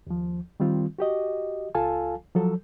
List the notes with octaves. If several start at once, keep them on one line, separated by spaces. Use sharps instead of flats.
D#2 F3
D#3 G3 C4 F4
F#4 G4 D#5
C#2 F4 A4 F5 G#5 A5
F3 F#3 A4